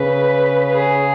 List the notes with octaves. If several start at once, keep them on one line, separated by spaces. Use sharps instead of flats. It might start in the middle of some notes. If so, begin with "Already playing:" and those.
Already playing: C#3 B4
G#4